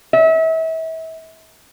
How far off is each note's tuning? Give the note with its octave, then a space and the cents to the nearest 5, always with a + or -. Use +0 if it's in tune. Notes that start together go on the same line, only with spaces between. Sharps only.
E5 -35